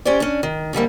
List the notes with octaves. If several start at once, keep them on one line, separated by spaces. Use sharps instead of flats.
C#4 G4 G#4 C5 D5
C#4 D4
D#3
G#2 D3 G3 A#3